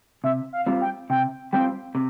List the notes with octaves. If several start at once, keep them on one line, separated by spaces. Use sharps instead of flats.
C3 E5
F5
G3 C4 F4
G5
C3 G5
G3 C4 F4 G5
C3